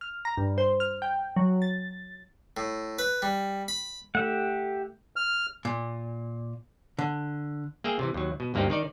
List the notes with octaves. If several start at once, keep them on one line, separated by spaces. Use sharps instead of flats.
F6
A#5
G2
C5
F6
G5
F#3
A6
A2
B4
G3
B5
A3 G4 E5 F#5
F6
A#2
D3
A#3 G#4 E5 G5
C3 E3
D#2 F#3
B2
D2 G2 A#3 C4 D#4 G4
D#3 D#4 D5